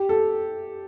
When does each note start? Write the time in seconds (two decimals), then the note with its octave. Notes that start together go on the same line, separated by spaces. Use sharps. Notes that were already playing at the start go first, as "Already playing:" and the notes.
Already playing: G4
0.09 A4